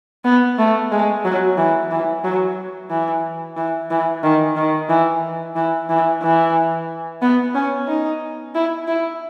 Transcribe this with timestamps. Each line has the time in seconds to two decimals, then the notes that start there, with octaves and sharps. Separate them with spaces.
0.25 B3
0.58 A3
0.92 G#3
1.25 F#3
1.57 E3
1.91 E3
2.24 F#3
2.90 E3
3.57 E3
3.91 E3
4.23 D#3
4.56 D#3
4.89 E3
5.56 E3
5.89 E3
6.23 E3
7.22 B3
7.55 C#4
7.88 D#4
8.55 E4
8.88 E4